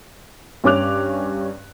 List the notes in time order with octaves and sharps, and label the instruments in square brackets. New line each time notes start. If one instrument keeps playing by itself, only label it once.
[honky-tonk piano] G2 C#4 C#5 D6 F#6 F7